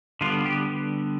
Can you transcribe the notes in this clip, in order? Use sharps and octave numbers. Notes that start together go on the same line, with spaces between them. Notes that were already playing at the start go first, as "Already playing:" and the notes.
D3 G3 B3 F4
G4